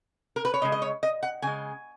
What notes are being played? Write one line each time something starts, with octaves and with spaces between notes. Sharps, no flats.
A#4
B4
C#5
C#3 G#3 D#5
D#5
C#5
D#5
F#5
C#3 G#3 G#5